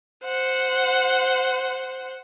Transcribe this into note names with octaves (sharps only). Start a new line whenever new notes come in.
C5 F#5